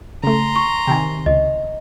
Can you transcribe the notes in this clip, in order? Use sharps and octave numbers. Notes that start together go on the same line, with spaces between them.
C#3 A3 A#5 C6
C#6
C3 D#3 G5 G#5
C#2 D#5